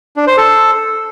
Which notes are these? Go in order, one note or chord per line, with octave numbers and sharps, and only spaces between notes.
D4
C5
A4